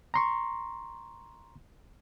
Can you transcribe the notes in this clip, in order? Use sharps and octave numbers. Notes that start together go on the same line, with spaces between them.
A#5 C6 C#6